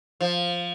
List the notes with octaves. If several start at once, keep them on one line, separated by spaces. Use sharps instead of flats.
F3